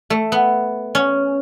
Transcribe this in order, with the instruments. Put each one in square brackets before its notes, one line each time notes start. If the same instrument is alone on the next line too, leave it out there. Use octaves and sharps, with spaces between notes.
[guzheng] A3
B3
C#4